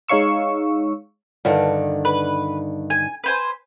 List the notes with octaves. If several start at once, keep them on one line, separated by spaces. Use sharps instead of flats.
G#3 D#4 C#5 F5 C#6 E6
G2 D3 D#3
B4
G#5
B4 C5 G#5